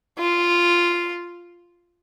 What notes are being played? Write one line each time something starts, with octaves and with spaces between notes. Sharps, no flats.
F4